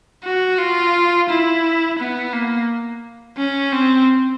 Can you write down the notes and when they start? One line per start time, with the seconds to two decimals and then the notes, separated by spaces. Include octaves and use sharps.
0.24 F#4
0.58 F4
1.29 E4
1.99 B3
2.33 A#3
3.38 C#4
3.72 C4